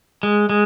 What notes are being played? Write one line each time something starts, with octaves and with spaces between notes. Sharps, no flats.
G#3
G#3